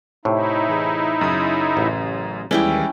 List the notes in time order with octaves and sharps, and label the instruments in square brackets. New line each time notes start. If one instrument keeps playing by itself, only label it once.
[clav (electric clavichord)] A2 C3 [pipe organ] D#4 E4
[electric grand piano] E3 G#4
F#2 C#3 D#6
[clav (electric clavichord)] A1
[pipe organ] D#2 [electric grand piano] E3 G3 G#3 [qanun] C#4 E4 G5